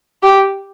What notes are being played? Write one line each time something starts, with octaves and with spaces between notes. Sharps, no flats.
G4